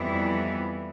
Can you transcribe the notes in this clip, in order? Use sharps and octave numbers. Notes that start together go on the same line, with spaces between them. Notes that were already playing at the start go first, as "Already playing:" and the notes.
Already playing: F2 E3 G3 B3 E4